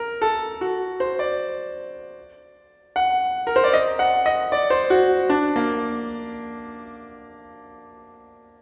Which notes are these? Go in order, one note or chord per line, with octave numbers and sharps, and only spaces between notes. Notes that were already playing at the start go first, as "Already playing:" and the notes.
Already playing: A#4
A4
F#4
C5
D5
F#5
A#4
C5
D5
D#5
F#5
D#5
D5
C5
F#4
D4
A#3